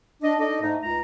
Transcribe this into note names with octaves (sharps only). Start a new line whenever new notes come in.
D4 D#5
D#4 A4 D5 D#5
G#2 A3 D#4
C#2 A#5